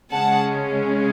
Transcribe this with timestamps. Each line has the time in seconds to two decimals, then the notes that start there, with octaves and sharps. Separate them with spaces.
0.11 C#3 G#3 C#4 F#5 A5